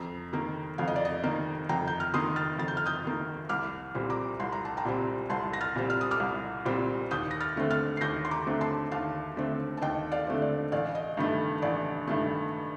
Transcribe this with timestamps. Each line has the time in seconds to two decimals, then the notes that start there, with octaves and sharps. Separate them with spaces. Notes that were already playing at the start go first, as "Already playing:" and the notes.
Already playing: F2 A#5
0.33 D#3 A#3
0.78 F2 F5
0.88 D#5
0.96 D5
1.05 D#5
1.24 D#3 A#3
1.69 F2 G5 A#5
1.88 G6
2.00 F6
2.14 D#3 A#3 C6 D#6
2.36 F6 A6
2.59 F2 A6
2.68 G6
2.77 F6
2.86 D#6 G6
3.05 D#3 A#3
3.49 C2 D6 F6
3.95 A#2 G3 C4
4.10 A#5 D6
4.40 C2 C6
4.52 A#5
4.65 A5
4.77 G5 A#5
4.85 A#2 G3 C4
5.30 C2 A5 C6
5.53 A#6
5.61 F6 A6
5.76 A#2 G3 C4
5.90 F6
6.01 D#6
6.11 D6 F6
6.20 C2
6.65 A#2 G3 C4
7.11 D#2 D#6 G6
7.31 A#6
7.40 F6 A6
7.56 D3 A3 C4
7.71 F6 A6
7.97 C7
8.01 D#2 G6 A#6
8.25 C6
8.31 A#5 D6
8.46 D3 A3 C4
8.61 A5 C6
8.91 D#2 F5 A5
9.37 D3 A3 C4
9.77 A5
9.82 D#2 D#5 G5
10.12 D5 F5
10.27 D3 A3 C4
10.42 D5
10.72 A1 D5 F5
10.95 D#5
11.17 G2 D#3 A3
11.62 A1 D5
12.07 G2 D#3 A3